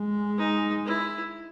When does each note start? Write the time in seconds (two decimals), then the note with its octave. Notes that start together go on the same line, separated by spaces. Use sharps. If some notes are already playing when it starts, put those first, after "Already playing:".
Already playing: G#3
0.38 D#4
0.86 E4